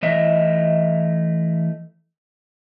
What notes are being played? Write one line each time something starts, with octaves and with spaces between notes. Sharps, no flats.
E3 A3 D#5 E5